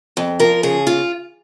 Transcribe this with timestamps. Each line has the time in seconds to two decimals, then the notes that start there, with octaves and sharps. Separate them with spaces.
0.17 F2
0.40 F3 A#4
0.63 C#3 G#4
0.87 F4